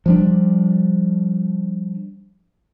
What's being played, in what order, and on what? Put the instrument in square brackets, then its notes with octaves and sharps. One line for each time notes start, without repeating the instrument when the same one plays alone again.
[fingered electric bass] F3 G3 D4